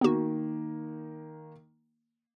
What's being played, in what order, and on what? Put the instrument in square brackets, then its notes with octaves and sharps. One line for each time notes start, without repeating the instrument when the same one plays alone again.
[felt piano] D#3 A#3 [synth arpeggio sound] B3 F#4